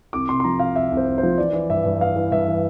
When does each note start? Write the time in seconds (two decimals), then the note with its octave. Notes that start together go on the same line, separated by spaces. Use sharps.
0.13 C2 D6
0.29 C3 C6
0.40 C6
0.44 F3 A#5
0.60 C3 F5
0.75 C2 E5
0.92 C2
0.97 C5
1.07 C2
1.18 C5
1.23 F3
1.38 E3 D5
1.53 E3
1.70 G2 E5
1.85 G2
2.01 E3 F5
2.16 E3
2.31 G2 E5
2.48 E3